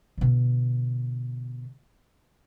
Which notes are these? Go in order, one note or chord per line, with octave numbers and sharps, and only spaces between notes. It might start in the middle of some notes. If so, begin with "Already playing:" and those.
B2 D3